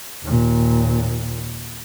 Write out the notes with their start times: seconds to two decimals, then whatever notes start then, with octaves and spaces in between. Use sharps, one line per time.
0.24 D#2 A#2